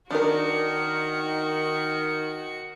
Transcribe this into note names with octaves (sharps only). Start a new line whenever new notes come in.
D#3 D4 F#4 A#4 C#7